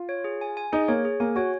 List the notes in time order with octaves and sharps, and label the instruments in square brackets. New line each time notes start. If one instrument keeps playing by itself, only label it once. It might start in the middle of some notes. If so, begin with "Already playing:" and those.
Already playing: [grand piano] F4
[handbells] C#5
G#4
G#5
G#5
[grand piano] D#4 [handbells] G#4
[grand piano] A#3 [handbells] C#5
[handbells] G#4
[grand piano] A#3 [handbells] G#5
[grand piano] F#4 [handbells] C#5